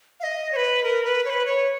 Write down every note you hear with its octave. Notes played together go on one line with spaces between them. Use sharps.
F5
D#5
C#5
B4
A#4
B4
C#5
B4
C#5